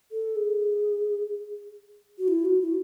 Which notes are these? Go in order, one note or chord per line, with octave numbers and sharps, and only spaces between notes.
A4
G#4
F#4
E4
F#4
E4